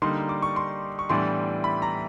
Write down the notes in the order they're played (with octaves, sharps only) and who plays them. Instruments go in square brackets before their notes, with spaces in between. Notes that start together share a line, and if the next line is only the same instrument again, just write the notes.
[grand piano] D3 G3 A#3 D#4 C6
D6
C#6
C6
C#6
A2 E3 G3 B3 D4 C6
B5
A#5